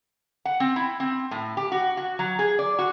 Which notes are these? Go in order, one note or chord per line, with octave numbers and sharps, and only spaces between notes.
F#5
C4
E4
C4
A2
G4
F#4
F#4
F#3
G#4
D5
F#4